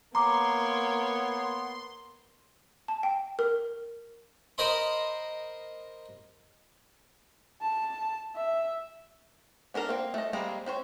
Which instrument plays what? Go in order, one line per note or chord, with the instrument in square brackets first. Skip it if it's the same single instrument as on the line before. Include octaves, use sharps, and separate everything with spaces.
[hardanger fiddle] A#3 C#5 [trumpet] B3 [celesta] A#5 D6 [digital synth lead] C6
[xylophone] A5
G5
A#4
[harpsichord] A#4 C5 D#5 B5 C6
[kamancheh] A5
E5
[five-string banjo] B3 D4 A4 A#4
A#3 C4
A3 D#5
G3 G#3 A#3 C4 G#4
C4 C5 C#5